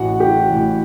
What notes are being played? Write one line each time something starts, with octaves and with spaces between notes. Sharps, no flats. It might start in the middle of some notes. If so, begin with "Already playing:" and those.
Already playing: A1 A2 E3 F#4 F#5
G4 G5
A1 A2 E3